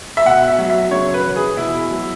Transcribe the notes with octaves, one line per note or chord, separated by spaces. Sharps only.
E5
B2 F#5
E5
F#3
E5
C#3 C#5
B4
E3
G#4
B2 E4
F#3